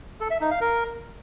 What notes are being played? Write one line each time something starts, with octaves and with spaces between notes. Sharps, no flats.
A4
E5
D#4
F5
A#4